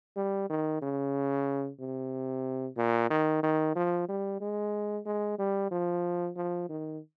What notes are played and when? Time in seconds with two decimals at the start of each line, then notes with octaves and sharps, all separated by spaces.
0.17 G3
0.50 D#3
0.82 C#3
1.80 C3
2.77 A#2
3.10 D#3
3.43 D#3
3.76 F3
4.09 G3
4.41 G#3
5.06 G#3
5.39 G3
5.71 F3
6.36 F3
6.69 D#3